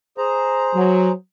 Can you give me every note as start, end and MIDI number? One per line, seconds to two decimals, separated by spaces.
0.18 1.12 68
0.18 1.12 72
0.18 1.12 82
0.74 1.10 54